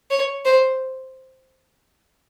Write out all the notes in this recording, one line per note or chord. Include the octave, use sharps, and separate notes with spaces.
C#5
C5